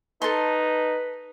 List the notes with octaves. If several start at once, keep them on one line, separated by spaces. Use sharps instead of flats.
D#4 A4 B4 A5 C6